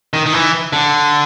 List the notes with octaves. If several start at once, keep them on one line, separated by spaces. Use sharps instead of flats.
D#3
D#3
E3
D3